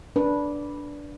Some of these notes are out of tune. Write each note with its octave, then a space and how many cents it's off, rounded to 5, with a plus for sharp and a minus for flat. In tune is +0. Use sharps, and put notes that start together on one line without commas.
D4 -10 B4 -10